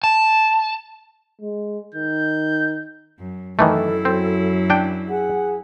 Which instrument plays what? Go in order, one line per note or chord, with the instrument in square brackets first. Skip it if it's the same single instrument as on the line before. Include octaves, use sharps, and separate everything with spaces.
[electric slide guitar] A5
[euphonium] G#3
[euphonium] D#3 [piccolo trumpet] G6
[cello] F#2
[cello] F#2 E4 [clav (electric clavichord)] D#3 E3 A3 [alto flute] A4
[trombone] F#3 [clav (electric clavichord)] C4
[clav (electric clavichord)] D4 G5
[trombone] G#4 [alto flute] F#5